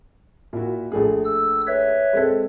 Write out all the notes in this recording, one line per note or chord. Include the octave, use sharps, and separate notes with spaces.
A#2 E4 F#4
A#1 A3 G#4
E6
B4 C#5 E5
G#3 C4 A4